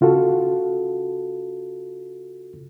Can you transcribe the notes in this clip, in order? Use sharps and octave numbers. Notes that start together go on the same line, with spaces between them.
C#3 F4 F#4 A4